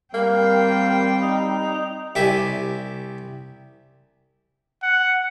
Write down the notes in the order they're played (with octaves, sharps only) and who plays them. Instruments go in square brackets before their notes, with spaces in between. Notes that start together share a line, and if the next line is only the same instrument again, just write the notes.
[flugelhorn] G3 [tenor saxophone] A#3 [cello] C4 G5
[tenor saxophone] D#4
[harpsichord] C2 G4 E5 G#5
[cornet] F#5